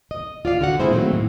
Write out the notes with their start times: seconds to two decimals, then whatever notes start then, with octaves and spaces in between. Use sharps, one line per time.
0.11 D#5
0.45 F4 D5 F5
0.61 D3 F#4 F#5
0.80 A#2 G#3 C4 E4 G#4 C5
0.92 D#3 F#3 A3 A#3 C4
1.13 A2